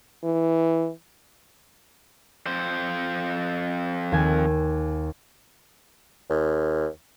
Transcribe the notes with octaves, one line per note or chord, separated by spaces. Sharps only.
E3
F2 C5
D#2 G#5
D#2